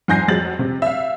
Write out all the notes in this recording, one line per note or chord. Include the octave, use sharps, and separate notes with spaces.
F2 G#2 G#5 G6 A#6 C7
F2 F#3 G#3 A6 F#7
C3
E5 F5